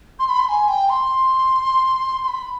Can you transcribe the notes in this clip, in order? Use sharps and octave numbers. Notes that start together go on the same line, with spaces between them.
C6
B5
C6
G#5
G5
C6
C6
B5